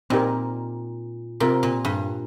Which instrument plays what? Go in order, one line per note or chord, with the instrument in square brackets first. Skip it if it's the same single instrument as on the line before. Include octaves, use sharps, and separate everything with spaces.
[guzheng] A#2 [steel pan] C4 D#4 G4 A#4
[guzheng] C3 [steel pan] C4 F4 A#4
[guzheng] A#2
G2